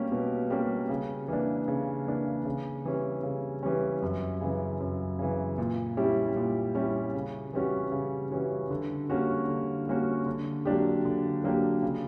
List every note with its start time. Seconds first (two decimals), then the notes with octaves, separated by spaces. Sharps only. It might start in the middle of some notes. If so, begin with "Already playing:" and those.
Already playing: B2 G3 A#3 C#4 G4
0.12 B2
0.50 G3 A#3 C#4 G4
0.89 C#3
1.28 E3 A#3 D4
1.68 C#3
2.07 E3 A#3 D4
2.45 C#3
2.85 E3 G3 C#4
3.23 C#3
3.63 E3 G3 C#4
4.02 F#2
4.41 C#3 E3
4.80 F#2
5.19 C#3 E3
5.58 A#2
5.97 G3 C#4 E4 G4
6.36 A#2
6.75 G3 C#4 E4 G4
7.14 C#3
7.53 E3 G3 C#4 F#4
7.92 C#3
8.31 E3 G3 C#4 F#4
8.70 D3
9.09 G3 A#3 C#4 F#4
9.48 D3
9.87 G3 A#3 C#4 F#4
10.26 D3
10.65 F#3 A#3 D4 G4
11.05 D3
11.44 F#3 A#3 D4 G4
11.82 C#3